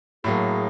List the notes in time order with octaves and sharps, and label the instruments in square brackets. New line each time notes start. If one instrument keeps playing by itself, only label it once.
[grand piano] A2 F#3 A#3 [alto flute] G#4